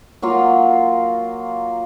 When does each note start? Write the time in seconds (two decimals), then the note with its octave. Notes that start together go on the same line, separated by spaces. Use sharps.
0.22 F#3 A#3 F4